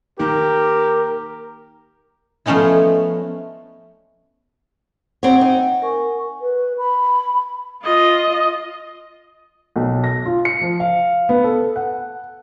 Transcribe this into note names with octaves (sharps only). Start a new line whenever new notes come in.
D#3 A#3 G4 A#4
F3 A3 B3 C#4 D#4 E4
G3 C4 C#5 F#5 G5
D#4 F#5
A#4 G#5 C#6
B4
B5
F4 D#5
B1
A#6
F4
C#7
F3
F5
B3
A4
F#5